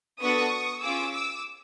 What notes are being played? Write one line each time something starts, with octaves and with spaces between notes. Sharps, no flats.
B3 D4 F#4 A4 C#6 D#6
C#4 F4 G#4 D6 E6
D6 E6